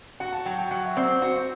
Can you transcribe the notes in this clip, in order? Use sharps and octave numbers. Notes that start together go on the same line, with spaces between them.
F#4 F#5
A5
F#3 G5
G5
F#3 F#5
E5
C4 D5
F#4 C5